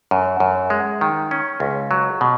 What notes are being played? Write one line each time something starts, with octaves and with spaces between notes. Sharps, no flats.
F#2
F#2
G#3
D#3
C#4
C#2
F#3
B2